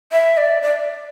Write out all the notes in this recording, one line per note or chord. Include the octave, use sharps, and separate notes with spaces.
E5
D5
D5